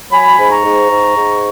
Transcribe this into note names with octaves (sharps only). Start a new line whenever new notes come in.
F#3 G#5 B5
G#2
A#5 C#6
G#2
G#2
G#2